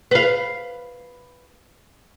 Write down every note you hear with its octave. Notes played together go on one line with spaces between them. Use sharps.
B4 F5